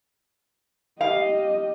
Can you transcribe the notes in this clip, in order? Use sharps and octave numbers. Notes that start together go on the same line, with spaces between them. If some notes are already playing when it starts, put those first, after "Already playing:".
G4 D#5 F5